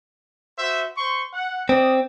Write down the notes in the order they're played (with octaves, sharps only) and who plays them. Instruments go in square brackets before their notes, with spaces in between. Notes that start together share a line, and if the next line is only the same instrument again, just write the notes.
[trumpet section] F#4 C5 E5
C5 C6 C#6
F#5
[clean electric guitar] C4 [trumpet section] D5 D#5